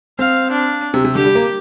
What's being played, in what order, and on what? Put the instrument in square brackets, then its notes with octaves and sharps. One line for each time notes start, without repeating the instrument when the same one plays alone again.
[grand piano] C4 [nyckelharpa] F5
[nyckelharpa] D4
[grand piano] C3
C3
[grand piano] D3 [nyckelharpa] G4
[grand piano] G3
A#3